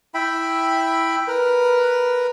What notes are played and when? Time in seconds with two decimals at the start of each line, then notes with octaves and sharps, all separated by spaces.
0.14 E4 E5 G5 B5
1.28 A#4 B4